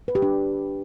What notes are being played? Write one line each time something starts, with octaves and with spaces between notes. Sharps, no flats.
B4
G4
D4